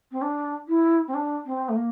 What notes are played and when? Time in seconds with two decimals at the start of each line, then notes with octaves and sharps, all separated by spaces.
0.12 C4
0.22 D4
0.68 E4
1.08 C4
1.14 D4
1.46 C4
1.69 A3
1.76 A#3